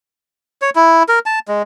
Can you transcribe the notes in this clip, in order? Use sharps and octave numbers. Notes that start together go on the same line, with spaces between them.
C#5
E4
A#4
A5
G#3